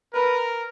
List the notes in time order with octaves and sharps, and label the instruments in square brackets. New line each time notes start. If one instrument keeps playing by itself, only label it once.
[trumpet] A#4 [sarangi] B4